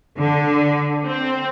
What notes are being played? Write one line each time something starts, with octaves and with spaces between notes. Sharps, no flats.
D3
C4